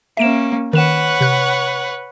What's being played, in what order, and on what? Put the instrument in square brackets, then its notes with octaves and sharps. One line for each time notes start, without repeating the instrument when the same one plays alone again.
[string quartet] A#3 C#4 [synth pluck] E5 D7 E7
[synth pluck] D#3 E7 [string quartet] B4 C#5 F#5
[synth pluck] C3 F#6